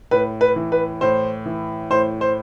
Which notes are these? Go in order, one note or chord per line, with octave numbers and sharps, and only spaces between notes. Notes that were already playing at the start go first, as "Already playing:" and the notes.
A2 B4
B4
E3
B4
A2 C5
E3
A2 C5
C5